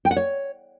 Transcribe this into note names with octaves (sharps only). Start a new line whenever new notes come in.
G5
F#5
C#5